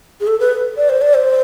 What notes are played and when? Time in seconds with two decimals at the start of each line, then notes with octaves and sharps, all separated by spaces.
0.20 G#4
0.27 A4
0.40 B4
0.77 D5
0.89 C5
1.01 D5
1.14 C5